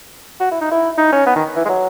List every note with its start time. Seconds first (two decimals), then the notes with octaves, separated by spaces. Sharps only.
0.40 F#4
0.51 E4
0.61 D#4
0.71 E4
0.98 D#4
1.12 C#4
1.26 B3
1.36 D#3
1.56 E3
1.65 G#3
1.69 F#3